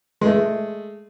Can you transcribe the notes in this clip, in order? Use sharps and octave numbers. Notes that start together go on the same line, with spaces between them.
G#3 A3